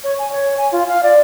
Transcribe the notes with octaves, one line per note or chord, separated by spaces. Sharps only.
C#5
G#5
C#5
G#5
F4
F5
D5